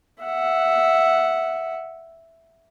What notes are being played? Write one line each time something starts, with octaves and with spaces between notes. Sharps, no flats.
E5 F#5